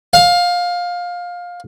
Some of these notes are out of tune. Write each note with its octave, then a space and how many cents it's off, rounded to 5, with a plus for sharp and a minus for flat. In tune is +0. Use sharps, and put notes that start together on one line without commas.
F5 +20